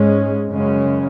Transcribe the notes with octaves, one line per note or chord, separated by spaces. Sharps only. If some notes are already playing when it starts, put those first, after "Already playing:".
Already playing: G#2 G#3 C#4
F#2 C#3 G#3 C#4